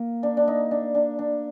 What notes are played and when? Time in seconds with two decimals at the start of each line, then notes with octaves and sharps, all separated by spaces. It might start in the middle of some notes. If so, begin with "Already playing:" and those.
Already playing: A#3
0.23 D4
0.37 D4
0.48 D#4
0.71 D4
0.95 D4
1.19 D4